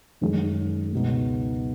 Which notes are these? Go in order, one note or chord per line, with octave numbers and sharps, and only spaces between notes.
F#2 D#3 G#3 C#4 G#4
C#2 B2 G#3 B3 D#4